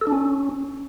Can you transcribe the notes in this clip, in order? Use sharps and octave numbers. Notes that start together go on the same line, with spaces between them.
A4
D4
C#4